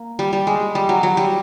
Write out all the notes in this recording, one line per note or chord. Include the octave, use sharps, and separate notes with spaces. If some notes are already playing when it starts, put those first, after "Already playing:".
Already playing: A#3
G3
G3
G#3
G3
F#3
F#3
G3